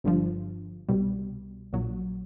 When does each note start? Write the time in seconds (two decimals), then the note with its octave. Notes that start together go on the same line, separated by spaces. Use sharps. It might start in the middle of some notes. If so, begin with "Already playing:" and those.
0.04 G1 G2 D3 F3
0.89 C2 B2 G3
1.73 A#1 A#2 F#3